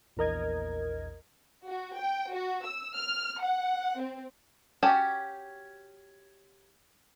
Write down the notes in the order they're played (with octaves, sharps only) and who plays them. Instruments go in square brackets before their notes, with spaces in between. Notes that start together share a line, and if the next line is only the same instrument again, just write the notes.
[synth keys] A#1 E2 A#4 D#5 G#6
[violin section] F#4
G5
F#4
E6
F6
F#5
C4
[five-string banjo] C#4 F#4 G4 G#5 A5